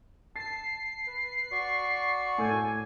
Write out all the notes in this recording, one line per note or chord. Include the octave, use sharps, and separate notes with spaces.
A5 A6 C7
B4
F#4 D5 C#6
A2 A4 G#5 G6